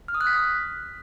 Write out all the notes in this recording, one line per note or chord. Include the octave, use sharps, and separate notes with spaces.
F6
D#6
F#6
B6